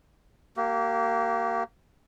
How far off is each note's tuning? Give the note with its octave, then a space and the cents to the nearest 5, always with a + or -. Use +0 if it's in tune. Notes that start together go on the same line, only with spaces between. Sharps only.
A#3 -15 G4 -40